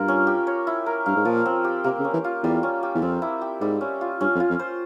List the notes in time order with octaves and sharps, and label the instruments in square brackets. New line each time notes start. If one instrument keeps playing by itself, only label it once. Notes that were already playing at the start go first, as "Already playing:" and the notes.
Already playing: [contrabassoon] G2 [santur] A#3 F4 A#4
[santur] C#4
G4
C#5
E4
A#4
[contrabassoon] G2 [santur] F5
[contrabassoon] G#2
[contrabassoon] A#2 [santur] F3
[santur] C4
G4
[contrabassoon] C3 [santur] A#3
[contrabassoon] C#3
[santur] C#4
[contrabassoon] E3
[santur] F4
[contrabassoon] E2 [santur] G3
[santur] C#4
G4
[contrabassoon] E2
[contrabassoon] F2 [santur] C4
[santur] E4
G4
[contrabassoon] G#2 [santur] G3
[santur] C#4
F4
[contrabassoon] G2 [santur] C#4
[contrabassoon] F2
[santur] F4
[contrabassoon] F2
[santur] C5